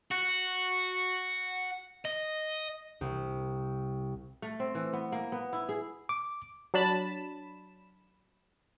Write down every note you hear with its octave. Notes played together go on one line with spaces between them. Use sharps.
F#4
D#5
C2
A3
C4
E3
B3
A#3
B3
E4
G#4
D6
F#3 D4 A5 B5 A6 E7